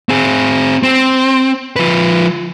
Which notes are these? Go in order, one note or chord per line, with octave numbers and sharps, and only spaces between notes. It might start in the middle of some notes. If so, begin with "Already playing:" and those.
C4 G#4
C4
F3 B4